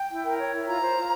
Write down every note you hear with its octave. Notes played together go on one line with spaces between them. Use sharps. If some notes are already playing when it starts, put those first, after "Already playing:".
Already playing: G5
E4
A#4
C#5
E4
F4 A#5
C5
F4